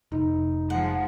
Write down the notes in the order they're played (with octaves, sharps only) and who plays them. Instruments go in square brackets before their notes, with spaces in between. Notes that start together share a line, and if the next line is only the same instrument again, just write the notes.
[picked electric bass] F1 [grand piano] D#4
[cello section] F3 G#3 [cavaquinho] F#5